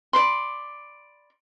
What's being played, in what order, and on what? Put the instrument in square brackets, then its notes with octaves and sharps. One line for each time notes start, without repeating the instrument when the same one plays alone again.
[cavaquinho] D5 B5 C6